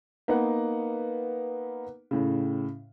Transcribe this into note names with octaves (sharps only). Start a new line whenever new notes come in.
A#3 B3 D#4 B4 F#5
A2 C#3